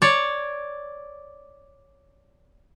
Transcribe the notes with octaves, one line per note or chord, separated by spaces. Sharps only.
C#5 D5